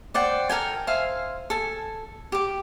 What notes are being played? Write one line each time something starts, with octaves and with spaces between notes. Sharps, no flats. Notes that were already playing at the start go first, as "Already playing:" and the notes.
C5 D5 F#5 G5
A4 A#4 G5 G#5
C5 E5 F5 G#5
A4 G#5
G4 D6